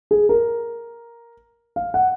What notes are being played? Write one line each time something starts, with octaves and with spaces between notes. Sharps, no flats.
G#4
A#4
F5
F#5